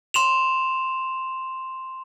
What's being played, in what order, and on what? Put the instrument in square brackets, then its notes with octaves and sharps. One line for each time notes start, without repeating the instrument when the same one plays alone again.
[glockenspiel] C6 E7 F7